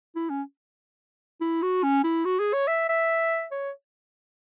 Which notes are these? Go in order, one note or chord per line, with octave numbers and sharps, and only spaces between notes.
E4
C#4
E4
F#4
C#4
E4
F#4
G#4
C#5
E5
E5
C#5